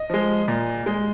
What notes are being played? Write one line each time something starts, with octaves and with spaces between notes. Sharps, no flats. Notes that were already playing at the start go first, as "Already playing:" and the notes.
Already playing: D#5
F3 G#3
A#2
G#3